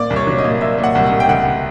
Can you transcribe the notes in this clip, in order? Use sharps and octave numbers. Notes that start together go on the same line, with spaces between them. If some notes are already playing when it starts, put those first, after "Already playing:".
Already playing: A#2 D5
C2
C#5
F#3
D#5
A#2
A#2 E5
A#2
F#5
C2
F#5
C2
G5
C#2 F#5